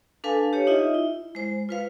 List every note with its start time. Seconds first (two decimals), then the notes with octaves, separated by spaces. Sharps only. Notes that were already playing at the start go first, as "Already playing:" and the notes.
0.24 D4 A4 B4 F5 G#5 A5
0.53 G4 C#5
0.67 D#4 F4 D#5 E5
0.94 E4
1.35 G#3 C5
1.69 F4 B4 F5